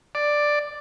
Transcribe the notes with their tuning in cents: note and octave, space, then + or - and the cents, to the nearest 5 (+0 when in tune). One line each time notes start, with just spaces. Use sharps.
D5 +5